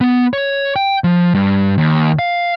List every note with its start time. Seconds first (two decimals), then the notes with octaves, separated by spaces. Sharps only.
0.01 B3
0.33 C#5
0.76 G5
1.04 F3
1.35 G2
1.78 D#2
2.19 F5